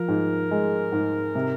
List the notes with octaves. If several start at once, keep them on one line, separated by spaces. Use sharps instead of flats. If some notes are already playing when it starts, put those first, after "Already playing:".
Already playing: F3 A#4
G#2
G#3
G#2
C3